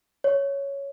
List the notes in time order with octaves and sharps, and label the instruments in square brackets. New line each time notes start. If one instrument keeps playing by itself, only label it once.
[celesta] C#5